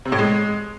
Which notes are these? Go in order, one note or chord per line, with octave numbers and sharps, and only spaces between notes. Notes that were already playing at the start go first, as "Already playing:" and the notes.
C3
A2
G#3